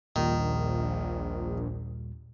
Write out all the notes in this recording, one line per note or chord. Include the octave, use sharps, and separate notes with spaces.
A#1 D#2 A#2 D#3 G3